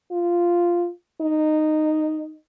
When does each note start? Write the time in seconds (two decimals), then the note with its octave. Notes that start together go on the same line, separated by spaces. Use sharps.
0.12 F4
1.21 D#4